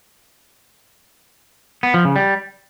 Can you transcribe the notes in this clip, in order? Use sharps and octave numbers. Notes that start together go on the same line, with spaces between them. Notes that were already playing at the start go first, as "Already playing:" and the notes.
B3
F3
C#3
G3